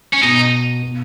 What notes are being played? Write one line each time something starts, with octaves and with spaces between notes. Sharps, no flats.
C#4
B2 D#4
B2